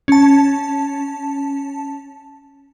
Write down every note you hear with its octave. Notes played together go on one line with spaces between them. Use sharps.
C#4 A5